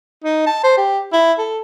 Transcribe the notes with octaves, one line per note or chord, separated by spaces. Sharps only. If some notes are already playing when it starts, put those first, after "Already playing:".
D#4
A5
C5
G4
E4
A4